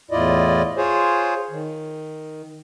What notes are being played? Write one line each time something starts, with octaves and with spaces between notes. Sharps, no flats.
E2 A2 E4 F4 D5 D#5
F4 G#4 C5 C#5
D#3